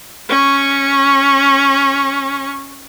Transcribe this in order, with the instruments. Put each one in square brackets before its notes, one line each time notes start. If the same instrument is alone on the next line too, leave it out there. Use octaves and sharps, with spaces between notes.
[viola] C#4 C#6